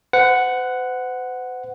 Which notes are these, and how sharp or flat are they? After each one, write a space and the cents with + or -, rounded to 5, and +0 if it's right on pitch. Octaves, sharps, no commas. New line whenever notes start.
C5 -45 F#5 +0